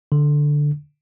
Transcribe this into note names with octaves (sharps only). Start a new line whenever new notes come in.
D3